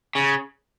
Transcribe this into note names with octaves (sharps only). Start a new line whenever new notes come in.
C#3